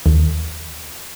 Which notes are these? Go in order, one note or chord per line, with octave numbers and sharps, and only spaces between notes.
D#2